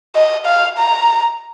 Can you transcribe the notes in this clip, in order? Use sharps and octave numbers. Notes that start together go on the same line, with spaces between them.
D#5
F5
A#5